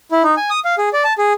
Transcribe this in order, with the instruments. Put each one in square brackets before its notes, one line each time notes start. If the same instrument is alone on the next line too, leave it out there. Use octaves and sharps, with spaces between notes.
[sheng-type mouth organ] E4
D#4
G#5
D#6
F5
G#4
D5
A5
G#4